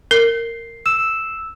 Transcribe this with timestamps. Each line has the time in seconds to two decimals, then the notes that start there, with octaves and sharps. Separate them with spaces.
0.11 A#4 C7
0.86 E6 E7